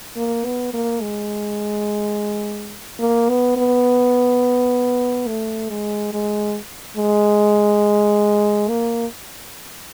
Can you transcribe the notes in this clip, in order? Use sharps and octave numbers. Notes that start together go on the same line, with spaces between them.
A#3
B3
A#3
G#3
A#3
B3
B3
A3
G#3
G#3
G#3
A#3